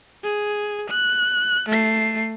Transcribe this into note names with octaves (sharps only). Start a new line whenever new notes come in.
G#4
F#6
A3 C7